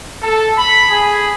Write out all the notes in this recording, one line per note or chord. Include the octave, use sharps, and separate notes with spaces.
A4
B5
G#4